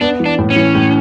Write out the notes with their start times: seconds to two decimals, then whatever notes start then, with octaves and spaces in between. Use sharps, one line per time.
0.01 B3 D4
0.20 E3
0.26 D4
0.39 A2
0.50 C#4
0.56 E3
0.75 A2